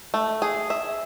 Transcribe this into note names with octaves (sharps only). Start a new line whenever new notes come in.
A3
G#4
E5